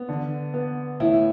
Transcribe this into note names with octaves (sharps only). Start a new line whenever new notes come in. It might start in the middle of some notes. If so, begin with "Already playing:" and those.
Already playing: B3
D3
B3
A2 E4